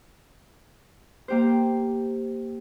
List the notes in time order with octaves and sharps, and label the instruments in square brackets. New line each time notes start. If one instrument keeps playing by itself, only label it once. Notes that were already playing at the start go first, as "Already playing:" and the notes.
[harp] A#3 G4 C5